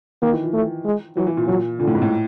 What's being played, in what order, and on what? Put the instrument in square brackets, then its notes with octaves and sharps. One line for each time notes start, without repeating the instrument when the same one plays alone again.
[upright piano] D#3 [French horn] A#3
[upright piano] E3
F3
[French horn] A3
G#3
[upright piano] E3 [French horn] F#3
[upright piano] E3
A#2
[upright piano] A#2 [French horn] F#3
[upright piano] A#2 [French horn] D3
[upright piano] A2
G#2
A2